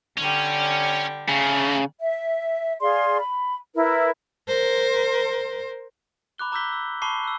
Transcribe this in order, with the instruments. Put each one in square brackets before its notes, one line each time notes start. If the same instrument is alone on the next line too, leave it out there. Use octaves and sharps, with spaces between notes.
[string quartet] D3 G3 [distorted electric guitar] C#4
[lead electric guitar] C#3 [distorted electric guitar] A3 A#4
[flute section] E5
G#4 D5 F5 C6
B5
E4 A#4 B4
[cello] A#4 C5
[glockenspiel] A#5 B5 D6 F#6 G7
A#5 D6 E6 G6 B6 G7
E6
A5 B5 C#6 D6 C7 G7
E6 F#6